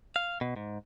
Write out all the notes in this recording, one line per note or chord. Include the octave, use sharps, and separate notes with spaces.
F5
B2
G#2